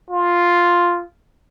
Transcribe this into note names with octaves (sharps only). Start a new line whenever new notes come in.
F4